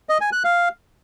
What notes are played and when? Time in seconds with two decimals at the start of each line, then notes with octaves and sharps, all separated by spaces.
0.09 D#5
0.21 G#5
0.32 F#6
0.44 F5